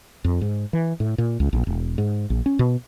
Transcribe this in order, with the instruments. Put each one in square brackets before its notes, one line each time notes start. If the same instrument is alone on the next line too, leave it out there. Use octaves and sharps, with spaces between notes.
[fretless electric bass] F2
G#2
E3
A2
A#2
C#2
A#1
E1
G#2
A#1
C#4
B2